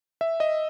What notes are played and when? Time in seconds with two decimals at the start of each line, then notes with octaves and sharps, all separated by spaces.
0.21 E5
0.40 D#5